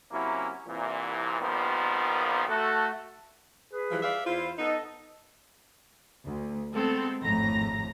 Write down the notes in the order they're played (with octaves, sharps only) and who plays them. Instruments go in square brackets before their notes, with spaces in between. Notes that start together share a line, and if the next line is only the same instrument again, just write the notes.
[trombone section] C3 F#3 A#3 C#4 E4
C2 A#2 E3
A#1 A#2 D#3 F3 G3 B3
A3 F#4 A4
[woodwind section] G#4 B4
[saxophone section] E3 F3 G3
D5 E5 F5
[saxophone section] E2 F4 [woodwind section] E4 C5
[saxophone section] B3 D#4 [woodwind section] A4 D#5
[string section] D2
G#3 A3 B3 C4 A4
G#1 F2 A2 A#5 A#6